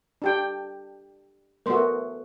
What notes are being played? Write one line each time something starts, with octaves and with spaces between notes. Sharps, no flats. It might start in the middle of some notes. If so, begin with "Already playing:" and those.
D4 G4 G5
A3 B3 F#4 A#4 C6